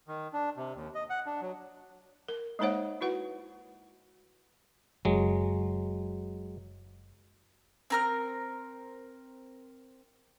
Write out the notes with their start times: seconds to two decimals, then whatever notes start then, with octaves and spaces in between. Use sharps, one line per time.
0.08 D#3
0.33 D4
0.57 C3
0.75 D#2
0.95 D#5
1.10 F#5
1.26 D4
1.41 F#3
2.28 A#4
2.59 G#3 A#3 D#4 C5 C#5 F#5
3.01 E4 F#4 B4 F#5
5.05 F#1 F#3 G#3
7.90 C4 A#4 F6